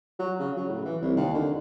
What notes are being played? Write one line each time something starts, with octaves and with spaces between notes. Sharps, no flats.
F#3
C#3
F#3
A2
E3
C2
D#2
D3